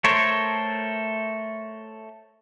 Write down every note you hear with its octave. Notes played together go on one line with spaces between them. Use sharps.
A3 A4 A#4 C5 C#5